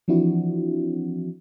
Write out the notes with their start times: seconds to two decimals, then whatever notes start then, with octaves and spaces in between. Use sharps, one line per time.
0.08 E3 F3 C4 D4 E4 F#4